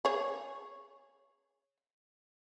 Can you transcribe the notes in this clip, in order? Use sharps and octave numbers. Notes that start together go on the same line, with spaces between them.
G#4 C#5